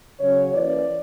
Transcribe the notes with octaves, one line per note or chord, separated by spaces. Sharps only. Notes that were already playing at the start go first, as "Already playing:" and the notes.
C#3 F#3 C#4 C#5
E3 A#3 C#4 D5